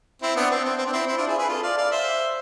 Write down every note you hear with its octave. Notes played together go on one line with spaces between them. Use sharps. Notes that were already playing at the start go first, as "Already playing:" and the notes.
C4 E4
B3 D4
C4
C4
C4
D4
C4 E4
C4 E4
D4 F4
E4 G#4
G#4 B4
F4 A4
D5 F5
D5 F5
C5 E5